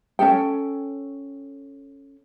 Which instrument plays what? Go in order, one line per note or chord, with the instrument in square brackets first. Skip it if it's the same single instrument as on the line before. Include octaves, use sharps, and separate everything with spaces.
[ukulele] C#4 D4 A4 G5